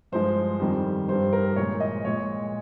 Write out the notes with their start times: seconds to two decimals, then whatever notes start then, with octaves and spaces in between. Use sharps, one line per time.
0.12 G2 F3 G#3 C5
0.60 F2 D#3 G3
1.08 G2 D#3 G3 C5
1.33 A#4
1.56 A#2 F3 G#3 C#5
1.80 D#5
2.05 A#2 G#3 C#5